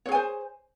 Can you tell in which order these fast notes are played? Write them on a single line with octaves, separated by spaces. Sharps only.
C#5 G#4 G#5 C5